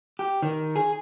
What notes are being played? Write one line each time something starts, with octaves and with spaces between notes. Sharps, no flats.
G4
D#3
G#4